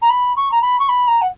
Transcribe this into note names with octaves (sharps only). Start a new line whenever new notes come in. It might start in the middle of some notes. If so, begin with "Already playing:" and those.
A#5
B5
C#6
A#5
B5
C#6
B5
A#5
F#5